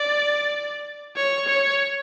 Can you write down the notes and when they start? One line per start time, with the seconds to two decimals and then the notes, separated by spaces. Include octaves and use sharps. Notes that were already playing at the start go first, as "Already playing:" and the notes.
Already playing: D5
1.16 C#5
1.48 C#5